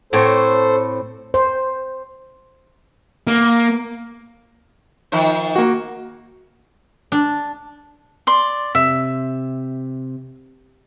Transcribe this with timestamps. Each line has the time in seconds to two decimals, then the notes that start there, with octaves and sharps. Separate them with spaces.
0.13 A2 C4 A4 C5 C#5
1.34 C5
3.27 A#3
5.12 D#3 F3 C5
5.56 A#3 F#4
7.12 D4
8.27 D5 C6
8.75 C3 E5